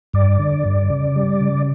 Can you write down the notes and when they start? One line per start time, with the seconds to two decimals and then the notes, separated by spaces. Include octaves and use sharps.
0.13 G2 D5
0.39 D3
0.65 G2
0.90 C#3
1.16 G3
1.41 C#3